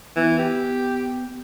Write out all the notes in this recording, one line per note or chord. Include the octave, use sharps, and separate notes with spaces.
E3 B3
G4